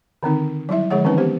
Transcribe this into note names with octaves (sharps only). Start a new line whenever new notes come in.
D3 D#3 C4 D#4
F#3 G3 E4 E5
D3 F3 G#3 G#4 C#5 F#5
D#3 E3 C4 C#4 D#4 B4
B3 G4 C5